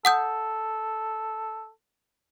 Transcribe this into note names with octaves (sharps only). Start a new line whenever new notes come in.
A4 F#5 D#6 G6